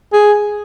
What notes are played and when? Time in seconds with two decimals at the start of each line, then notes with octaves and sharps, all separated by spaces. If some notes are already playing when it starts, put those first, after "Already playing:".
0.13 G#4